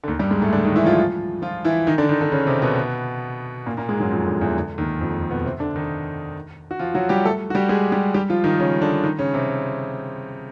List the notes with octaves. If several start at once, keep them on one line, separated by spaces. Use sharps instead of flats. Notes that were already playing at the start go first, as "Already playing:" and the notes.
D3
D#2 D#3
G2 G3
G#2 G#3
A2 A3
D3 D4
D#3 D#4
E3 E4
F3 F4
F3 F4
E3 E4
D#3 D#4
D3 D4
D#3 D#4
D3 D4
C#3 C#4
C3 C4
B2 B3
A#2 A#3
A#2 A#3
G#2 G#3
F#2 F#3
F2 F3
D3
E2 E3
D3
D#2 D#3
F2 F3
B2 B3
C3 C4
D3 D4
D#3 D#4
F#4
F3 F4
F#3 F#4
G3 G4
A3 A4
F#4
G3 G4
G#3 G#4
G3 G4
G3 G4
F3 F4
D#3 D#4
C#3 C#4
D3 D4
D#3 D#4
C#3 C#4
C3 C4